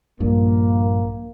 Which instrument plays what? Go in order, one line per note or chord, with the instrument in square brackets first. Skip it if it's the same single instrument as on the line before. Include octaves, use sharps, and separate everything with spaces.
[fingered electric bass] A#1 G2 A#2 [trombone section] A#3